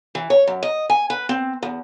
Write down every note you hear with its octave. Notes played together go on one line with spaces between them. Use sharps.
E3
C#5
F#2
D#5
G#5
B4
C4
E2